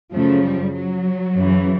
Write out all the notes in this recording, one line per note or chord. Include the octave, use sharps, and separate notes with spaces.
F#2 C#3 F3 A3
G3
F#3
F#2 C#3 E3